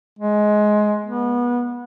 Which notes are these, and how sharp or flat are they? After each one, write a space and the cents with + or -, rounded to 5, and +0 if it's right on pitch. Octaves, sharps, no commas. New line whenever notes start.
G#3 +15
B3 -25